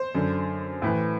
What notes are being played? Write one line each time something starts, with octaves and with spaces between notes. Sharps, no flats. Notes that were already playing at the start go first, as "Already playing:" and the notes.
Already playing: C5
F#2 D3
A2 E3